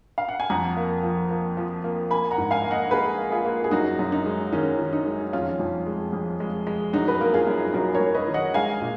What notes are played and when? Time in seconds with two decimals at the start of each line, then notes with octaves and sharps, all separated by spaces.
0.18 F5
0.28 F#5
0.40 G#5
0.50 F2 F#5 A#5
0.77 A#3
1.03 F3
1.31 A#3
1.57 F3
1.84 A#3
2.10 A#3 G#5 B5
2.31 F#5 A#5
2.38 G#2
2.51 F5 G#5
2.64 A#3
2.71 D#5 F#5
2.91 A#3 G#4 B4
3.18 A#3
3.32 F4 G#4
3.45 A#3
3.64 G#4
3.71 F#2 D#4 F#4
3.99 F#2
4.12 D#4
4.26 G#3
4.52 D#3 C#4
4.79 D#3
4.93 D#4
5.06 G#3
5.33 F2 C#4 F4
5.59 F2
5.86 G#3
6.13 F2
6.40 G#3
6.67 G#3
6.93 F#2 D#4 F#4
7.08 B4
7.21 A#3 A#4
7.34 F4 G#4
7.47 F#2
7.74 F#2 F#4 A#4
7.94 A#4 C#5
8.01 F#2
8.15 B4 D#5
8.28 D#3
8.34 D#5 F#5
8.54 G#3 F5 G#5
8.81 A#2